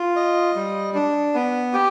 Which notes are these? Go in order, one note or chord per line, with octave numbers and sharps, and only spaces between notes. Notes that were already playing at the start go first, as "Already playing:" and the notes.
Already playing: F4
D#5
G3
D4
B3
G4